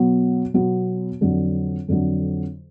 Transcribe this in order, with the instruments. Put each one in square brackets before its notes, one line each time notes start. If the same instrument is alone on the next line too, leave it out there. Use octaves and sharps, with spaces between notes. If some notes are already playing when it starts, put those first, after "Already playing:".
Already playing: [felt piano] B2 F#3 B3 F#4
B2 F#3 B3 F#4
F2 D3 F#3
F2 D3 F#3